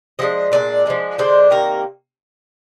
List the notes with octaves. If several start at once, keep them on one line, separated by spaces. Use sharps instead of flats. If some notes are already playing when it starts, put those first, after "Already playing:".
F3 G#3 D4 D#5
A#2 G#3 D4 D5
F3 G#3 D4
D3 G#3 D4 C5
C3 D#3 A#3 A#4